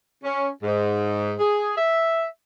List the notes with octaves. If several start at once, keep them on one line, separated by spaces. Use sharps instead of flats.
C#4
G#2
G#4
E5